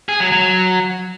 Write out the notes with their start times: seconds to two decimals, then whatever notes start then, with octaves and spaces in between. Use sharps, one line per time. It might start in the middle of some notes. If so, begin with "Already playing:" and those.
0.09 G#4
0.20 F#3
0.32 F#3